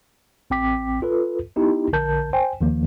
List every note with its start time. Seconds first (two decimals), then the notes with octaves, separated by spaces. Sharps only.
0.50 A1 C4 G5 D6 B6
1.02 F4 A4 B4
1.56 B3 D#4 E4 G4
1.93 A#1 D3 A#4 A5 G6
2.33 C5 G5 G#5
2.61 D#2 D#3 F3 A#3